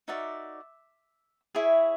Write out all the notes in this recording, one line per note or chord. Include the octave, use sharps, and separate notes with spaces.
D#4 F#4 A#4 D5 E5
E4 G#4 C#5 E5